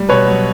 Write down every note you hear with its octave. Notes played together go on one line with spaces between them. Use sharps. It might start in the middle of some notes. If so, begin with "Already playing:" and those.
Already playing: G3
B2 B4 C#5
F#3